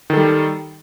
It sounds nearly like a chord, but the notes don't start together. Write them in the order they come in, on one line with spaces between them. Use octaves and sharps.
D#3 A4 G3